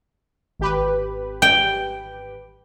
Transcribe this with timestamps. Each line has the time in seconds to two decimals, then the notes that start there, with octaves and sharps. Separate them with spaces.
0.60 G#1 G4 B4
1.42 G5